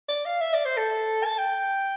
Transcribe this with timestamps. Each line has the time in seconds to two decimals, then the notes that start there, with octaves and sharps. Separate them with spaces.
0.09 D5
0.25 F5
0.41 E5
0.54 D5
0.65 C5
0.77 A4
1.25 A5
1.38 G5